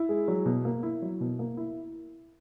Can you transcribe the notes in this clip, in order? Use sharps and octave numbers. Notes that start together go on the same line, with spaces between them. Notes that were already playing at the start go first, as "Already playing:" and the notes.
Already playing: E4
G#3
F#3
B2
A#3
E4
F#3
B2
A#3
E4